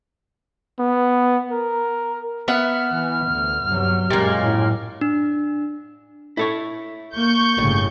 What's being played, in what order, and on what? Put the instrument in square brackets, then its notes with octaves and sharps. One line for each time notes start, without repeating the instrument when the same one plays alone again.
[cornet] B3
A#4
[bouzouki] B3 E5 F#5 [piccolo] F6
[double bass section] E3
D2
G2 C3 F#3
[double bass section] F#2 G#3 [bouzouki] A#2 A#3 [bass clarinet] G4
[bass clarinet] A2
[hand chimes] D4
[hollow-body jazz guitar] E4 A4 C#5
[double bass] A#3 [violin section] C#6 G6
[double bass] G1 C#3 [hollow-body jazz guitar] A2